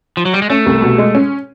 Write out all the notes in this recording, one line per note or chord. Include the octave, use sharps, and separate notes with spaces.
F3
F#3
G3
G#3
A3 C#4
C2
B2
G#3
C#4